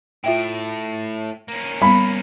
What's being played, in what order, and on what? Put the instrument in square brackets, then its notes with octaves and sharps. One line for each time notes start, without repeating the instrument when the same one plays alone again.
[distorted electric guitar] A2 [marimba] F4 E5 G5
[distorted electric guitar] A#3 C#4
[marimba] G3 B3 [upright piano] B5